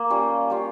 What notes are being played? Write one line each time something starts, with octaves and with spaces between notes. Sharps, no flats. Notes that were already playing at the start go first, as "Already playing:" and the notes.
Already playing: A#3
G3 C#4 F4
G3 C#4 F4